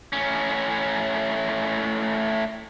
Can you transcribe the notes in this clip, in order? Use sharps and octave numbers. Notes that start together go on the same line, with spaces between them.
A2 C#4